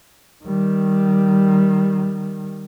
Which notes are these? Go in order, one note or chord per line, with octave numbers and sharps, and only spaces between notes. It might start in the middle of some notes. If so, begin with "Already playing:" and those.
D#3 G3